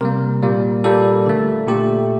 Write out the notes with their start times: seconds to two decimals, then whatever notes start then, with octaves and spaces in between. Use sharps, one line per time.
0.01 C3 G3 A#3 A#4
0.43 A#2 G3 A#3
0.84 A#2 G3 A#3 A4
1.26 D3 A3
1.68 A#2 A3 G4